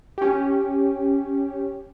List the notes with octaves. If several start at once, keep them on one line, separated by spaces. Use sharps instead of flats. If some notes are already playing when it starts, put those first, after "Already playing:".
C#4 G4